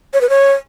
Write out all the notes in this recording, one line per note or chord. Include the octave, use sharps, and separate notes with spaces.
C#5
B4
C#5